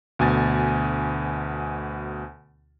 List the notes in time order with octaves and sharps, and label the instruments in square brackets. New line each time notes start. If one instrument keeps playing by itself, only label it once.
[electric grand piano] D2 B2 G#5 A6